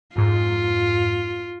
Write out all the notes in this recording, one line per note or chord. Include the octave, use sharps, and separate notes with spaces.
F2 G#2 F4